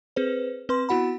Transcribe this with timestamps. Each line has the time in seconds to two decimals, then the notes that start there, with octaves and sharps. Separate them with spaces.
0.16 C4 G#4 B4 C5
0.69 C4 B4 C6
0.89 B3 E4 F#4 F#5 B5